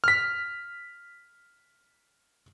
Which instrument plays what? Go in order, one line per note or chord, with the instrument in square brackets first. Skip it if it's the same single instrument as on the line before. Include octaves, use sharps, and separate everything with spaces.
[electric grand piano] F6 B6